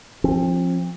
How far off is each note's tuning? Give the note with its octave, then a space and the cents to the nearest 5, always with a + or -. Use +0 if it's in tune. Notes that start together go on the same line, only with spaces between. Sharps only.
F3 +0 C4 +35